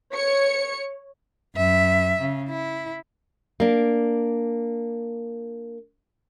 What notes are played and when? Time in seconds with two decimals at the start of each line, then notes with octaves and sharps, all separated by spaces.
0.14 C#5 C#7
1.56 F#2 E5
2.20 C#3
2.49 E4
3.60 A#3 D4